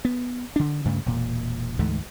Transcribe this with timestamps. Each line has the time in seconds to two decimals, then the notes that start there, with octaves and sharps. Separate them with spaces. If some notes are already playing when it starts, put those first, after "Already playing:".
0.05 B3
0.56 D3 D4
0.85 D2 G2 C#3 A3
1.06 E1 A#2
1.79 D2 G#2 E3 A3